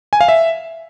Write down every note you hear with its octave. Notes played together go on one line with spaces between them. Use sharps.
G#5
F5
E5